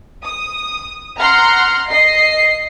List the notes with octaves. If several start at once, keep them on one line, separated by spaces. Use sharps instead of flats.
D#6
F#5 A#5 C6 F6
D#5 C7